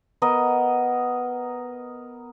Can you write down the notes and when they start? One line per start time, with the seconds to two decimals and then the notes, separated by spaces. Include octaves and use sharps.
0.22 B3 A#4 D#5